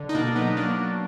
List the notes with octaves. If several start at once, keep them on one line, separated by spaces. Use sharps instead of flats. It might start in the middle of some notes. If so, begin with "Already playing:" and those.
Already playing: D3
D#4
B2 A#3 D4
F#3 B3 D#4
F#3 A#3 D4
F#3